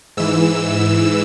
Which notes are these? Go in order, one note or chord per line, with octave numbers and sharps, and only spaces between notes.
G#2 E3 E6